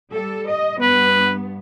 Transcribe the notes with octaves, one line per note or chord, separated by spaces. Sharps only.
G3 A4
D#5
G2 B3 B4